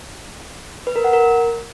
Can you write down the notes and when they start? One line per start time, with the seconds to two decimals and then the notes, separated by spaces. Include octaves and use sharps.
0.87 B4
0.96 A#4
1.04 F#5
1.13 A#4